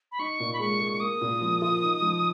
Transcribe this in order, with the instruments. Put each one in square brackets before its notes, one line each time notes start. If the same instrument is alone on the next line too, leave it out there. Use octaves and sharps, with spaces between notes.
[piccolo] B5
[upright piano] D#4 [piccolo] C#6
[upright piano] A#2
[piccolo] B5
[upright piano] G#3 [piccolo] C#6
[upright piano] G#4
[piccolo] C#6
[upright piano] A#3 [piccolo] D#6
[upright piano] A#2
F3
F4
D#4
F3